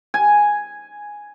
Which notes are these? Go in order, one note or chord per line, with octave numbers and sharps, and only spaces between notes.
G#5